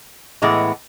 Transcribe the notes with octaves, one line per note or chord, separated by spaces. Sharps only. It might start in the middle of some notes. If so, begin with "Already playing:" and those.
A2 E3 G#3 B3